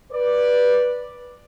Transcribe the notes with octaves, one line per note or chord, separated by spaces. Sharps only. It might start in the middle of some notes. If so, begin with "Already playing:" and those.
B4 D5